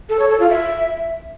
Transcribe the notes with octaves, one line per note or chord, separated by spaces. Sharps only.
A4
C#5
A4
F4
E5